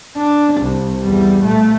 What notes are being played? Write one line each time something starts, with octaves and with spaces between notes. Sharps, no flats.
D4
C2
E2 G3
A#2 A3